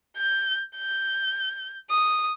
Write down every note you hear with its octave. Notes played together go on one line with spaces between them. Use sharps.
G6
G6
D#6